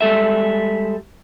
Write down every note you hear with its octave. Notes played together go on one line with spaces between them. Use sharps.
G3 G#3 A4 E5